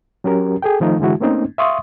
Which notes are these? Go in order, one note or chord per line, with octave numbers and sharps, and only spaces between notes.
F#3 C#4 G4 A#4
G#4 A4 G5
D#3 F3 A3 D#4
D3 E3 G#3 E4 F#4
A3 A#3 C4 C#4 D#4
E5 F5 C6 C#6 D#6